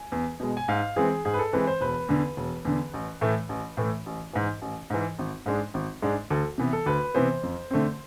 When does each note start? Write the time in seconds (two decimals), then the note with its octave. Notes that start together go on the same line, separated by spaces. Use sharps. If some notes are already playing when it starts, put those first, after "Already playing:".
Already playing: G#5
0.12 E2
0.40 B2 G#3
0.57 G#5
0.68 G#2 F5
0.96 E3 G#3 C4 G#4
1.25 G#2 G#4
1.34 B4
1.39 A4
1.53 E3 G#3 C4 B4
1.67 C5
1.81 E1 B4
2.09 E2 D3
2.37 E1
2.65 E2 D3
2.94 A1
3.21 A2 E3 A3
3.49 A1
3.77 A2 E3 A3
4.06 A1
4.33 G#2 E3
4.62 A1
4.90 G#2 E3
5.19 G#1
5.46 G#2 G#3 D4
5.74 G#1
6.02 G#2 G#3 D4
6.30 D2 A4
6.58 C3 E3 B3
6.73 A4
6.86 D2 B4
7.15 C3 E3 B3 C5
7.43 F2
7.71 D3 A3 C4